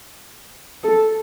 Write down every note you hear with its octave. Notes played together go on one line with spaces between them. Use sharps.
A4